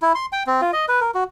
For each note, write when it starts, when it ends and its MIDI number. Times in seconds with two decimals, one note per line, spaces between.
0.02 0.13 64
0.15 0.26 84
0.32 0.43 79
0.47 0.61 60
0.61 0.71 65
0.73 0.85 75
0.88 1.00 71
1.01 1.11 70
1.14 1.24 66